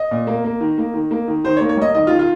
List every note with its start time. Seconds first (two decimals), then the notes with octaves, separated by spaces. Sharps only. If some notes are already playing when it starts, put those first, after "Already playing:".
Already playing: D#5
0.11 A#2
0.27 A#3
0.44 A#3
0.61 D#3
0.78 A#3
0.94 D#3
1.11 A#3
1.28 D#3
1.44 D#3 C5
1.57 C#5
1.61 A#3
1.69 C#5
1.77 G3 D#5
1.95 D#3 D#5
2.07 F4
2.11 D#3
2.19 F4